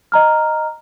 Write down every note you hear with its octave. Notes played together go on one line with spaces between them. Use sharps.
D#5 A#5 F6